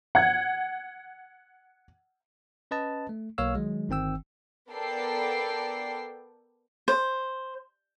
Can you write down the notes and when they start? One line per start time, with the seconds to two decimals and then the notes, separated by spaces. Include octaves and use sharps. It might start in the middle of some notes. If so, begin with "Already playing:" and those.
0.15 F#5 G#6
2.71 C#4 B4 D#5 A5
3.09 A3
3.38 B1 A#3 C#5 F5 E6 F6
3.55 D#3 F#3 G#3
3.89 G1 D#3 C4 G5 E6
4.72 B3 A4 A#4 D5 G5 C7
6.88 C5